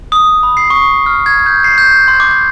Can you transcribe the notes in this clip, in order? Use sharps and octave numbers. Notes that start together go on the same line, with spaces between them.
D#6
B5
C7
C#6
F6
G#6
G6
C7
G6
C6
D6